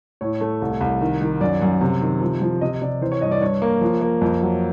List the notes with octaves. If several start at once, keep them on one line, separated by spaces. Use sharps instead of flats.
A2 C#5
A3
C2
C2
D#3
D#3
F#2 D5
F#2
C3
D#3
F3
F3
C3 D#5
C3 D5
E3 C5
C#5
G2 D#5
D5
G2 C#5
A#3
F3
A#3
F2
F#3